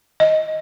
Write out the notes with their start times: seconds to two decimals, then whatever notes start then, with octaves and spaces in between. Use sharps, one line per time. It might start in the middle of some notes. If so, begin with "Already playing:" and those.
0.20 D#5